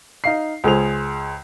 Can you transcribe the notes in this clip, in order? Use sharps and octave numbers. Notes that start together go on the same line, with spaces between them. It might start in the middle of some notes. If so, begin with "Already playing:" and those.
D#4 F5 C7
C#2 G#4 C5 F7